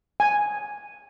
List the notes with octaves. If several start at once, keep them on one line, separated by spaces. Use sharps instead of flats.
G#5